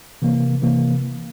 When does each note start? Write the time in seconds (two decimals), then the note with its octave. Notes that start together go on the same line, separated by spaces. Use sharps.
0.22 C3 E3 A#3
0.62 C3 E3 A#3